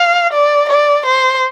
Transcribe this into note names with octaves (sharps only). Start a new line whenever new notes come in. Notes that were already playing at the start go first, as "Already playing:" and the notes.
Already playing: F5
D5
D5
C5